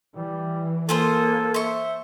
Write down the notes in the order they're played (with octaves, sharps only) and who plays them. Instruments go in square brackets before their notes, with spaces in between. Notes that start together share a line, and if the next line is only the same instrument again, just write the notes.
[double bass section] E3 [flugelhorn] G3
[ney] A#3 [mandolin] F4 G#4 C5 [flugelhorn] A4
[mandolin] C5 C#6 [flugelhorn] E5